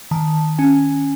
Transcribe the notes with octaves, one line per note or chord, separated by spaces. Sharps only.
D#3 A5
C#4 G#5